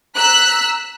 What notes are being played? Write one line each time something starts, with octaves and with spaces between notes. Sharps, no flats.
A#5 E6 F#6 B6